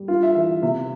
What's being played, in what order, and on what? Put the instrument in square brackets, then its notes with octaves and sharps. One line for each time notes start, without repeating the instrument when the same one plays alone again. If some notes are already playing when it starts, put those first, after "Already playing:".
Already playing: [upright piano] G3
G2 F4
E5
E3 E5
C3 E5